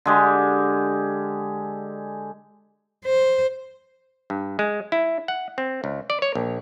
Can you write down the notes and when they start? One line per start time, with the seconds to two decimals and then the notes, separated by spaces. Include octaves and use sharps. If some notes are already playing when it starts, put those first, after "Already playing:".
0.05 D3 G#3 G4
3.05 C5
4.30 G2
4.59 G#3
4.92 E4
5.28 F#5
5.58 C4
5.84 C#2
6.10 D5
6.22 C#5
6.35 A#1